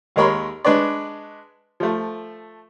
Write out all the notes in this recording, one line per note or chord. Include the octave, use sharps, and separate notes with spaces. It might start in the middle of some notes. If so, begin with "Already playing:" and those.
D#2 G#3 A#4 C#5 B5 C6
G#3 D4 B4 C#5 D5
F3 A3